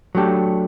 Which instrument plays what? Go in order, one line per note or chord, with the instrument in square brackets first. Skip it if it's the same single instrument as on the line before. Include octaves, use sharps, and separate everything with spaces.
[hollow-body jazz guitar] F#3 A3 D4 G4